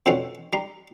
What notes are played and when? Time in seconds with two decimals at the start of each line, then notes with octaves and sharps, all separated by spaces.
0.06 F2 B2 D3 A3 C4 C#4
0.53 G3 A#5 C6